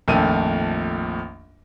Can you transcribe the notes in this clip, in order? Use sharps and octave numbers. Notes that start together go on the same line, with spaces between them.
A#1 F2 D#3 A3 D#7